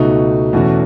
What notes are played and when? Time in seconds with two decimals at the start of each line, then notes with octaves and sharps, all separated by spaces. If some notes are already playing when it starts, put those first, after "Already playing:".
Already playing: C#2 B2 A3 D#4 F#4
0.53 E2 B2 A3 C#4 F#4